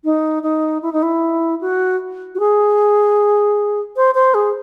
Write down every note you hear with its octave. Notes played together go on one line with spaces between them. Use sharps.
D#4
D#4
E4
D#4
E4
F#4
F#4
G#4
C5
C5
G#4